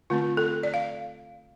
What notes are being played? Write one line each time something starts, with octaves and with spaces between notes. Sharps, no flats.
D3 A3 C4 F4
A4
D5
F5